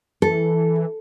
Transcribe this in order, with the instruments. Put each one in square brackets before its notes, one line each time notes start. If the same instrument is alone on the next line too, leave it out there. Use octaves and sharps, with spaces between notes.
[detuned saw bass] E3 [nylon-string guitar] A4